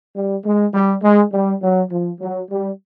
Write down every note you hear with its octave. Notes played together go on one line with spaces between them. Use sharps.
G3
G#3
G3
G#3
G3
F#3
F3
F#3
G3